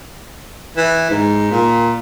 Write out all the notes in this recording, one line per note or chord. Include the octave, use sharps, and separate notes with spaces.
E3
G#2
A#2